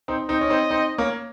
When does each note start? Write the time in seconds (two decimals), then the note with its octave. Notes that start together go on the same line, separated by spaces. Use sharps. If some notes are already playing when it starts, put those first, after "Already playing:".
0.08 C4 D#4
0.28 C4 D#4 D#5
0.41 C#4
0.50 C4 D#4
0.70 C4 D#4
0.98 A#3 C#4